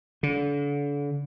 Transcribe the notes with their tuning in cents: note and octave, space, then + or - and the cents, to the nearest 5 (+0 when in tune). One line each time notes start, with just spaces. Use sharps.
D3 -35